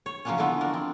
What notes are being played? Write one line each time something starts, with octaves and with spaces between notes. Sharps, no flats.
C#5
C#3 F3 F#3 A#3 B3 C#4
D3 E3 F3 G#3 A3 B3
D4 A#4
C4